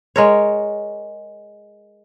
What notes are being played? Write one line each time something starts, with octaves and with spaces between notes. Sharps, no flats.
G#3 A#4 C#5